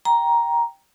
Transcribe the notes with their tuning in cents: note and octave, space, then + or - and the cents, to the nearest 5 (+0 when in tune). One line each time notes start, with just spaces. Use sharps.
G5 +0 A#5 +10